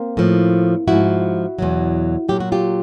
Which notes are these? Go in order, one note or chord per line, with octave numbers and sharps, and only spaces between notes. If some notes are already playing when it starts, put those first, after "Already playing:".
Already playing: A#3 C4
A2 F3
G#2 F3 E4 F#4
E2 B2 F#3
A#2 F#3 G4
F#4
F4 G4